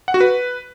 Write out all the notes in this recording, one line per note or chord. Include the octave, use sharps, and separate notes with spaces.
F#5
F#4
B4